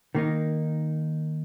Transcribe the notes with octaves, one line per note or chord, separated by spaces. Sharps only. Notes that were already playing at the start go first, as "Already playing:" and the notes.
D#3 A#3 D#4